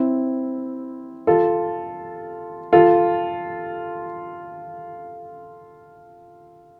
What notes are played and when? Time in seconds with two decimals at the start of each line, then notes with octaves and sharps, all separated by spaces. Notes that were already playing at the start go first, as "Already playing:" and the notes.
Already playing: C4 E4
1.27 F4 A4
2.73 F4 A4